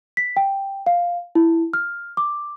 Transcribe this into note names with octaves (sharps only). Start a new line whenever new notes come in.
B6
G5
F5
E4
F6
D6